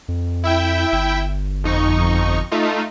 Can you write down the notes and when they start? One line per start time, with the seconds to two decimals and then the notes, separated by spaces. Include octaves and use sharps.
0.08 F2
0.44 E4 E5 G5
0.92 G1
1.64 F2 D#4 C#6
2.51 A3 D#4 F4